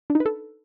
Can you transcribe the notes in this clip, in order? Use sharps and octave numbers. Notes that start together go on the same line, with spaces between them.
D4
D#4
B4
A4